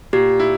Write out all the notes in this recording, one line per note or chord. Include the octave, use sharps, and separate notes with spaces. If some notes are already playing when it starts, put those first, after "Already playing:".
A#2 G4
E4